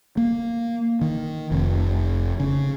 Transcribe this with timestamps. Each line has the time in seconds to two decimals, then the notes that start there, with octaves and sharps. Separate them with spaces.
0.17 A#3
1.01 D#3
1.51 F1
2.40 C#3